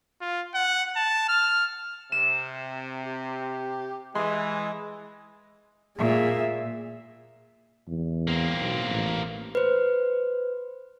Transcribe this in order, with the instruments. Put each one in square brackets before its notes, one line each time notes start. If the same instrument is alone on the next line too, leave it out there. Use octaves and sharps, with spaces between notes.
[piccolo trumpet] F4
F#5
A5
F6
[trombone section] C3 [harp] E7
[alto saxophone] G4
[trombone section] E3 [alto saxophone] G#3 [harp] C6
[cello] A#2 [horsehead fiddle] G#4 E5
[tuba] E2
[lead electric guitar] A#3 C4
[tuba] B1
A1
[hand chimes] B4 C5